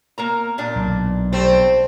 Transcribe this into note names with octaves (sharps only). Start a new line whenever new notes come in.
A#3 A#4 A#5
A#2 D4
B1
G3 A3 C4 C5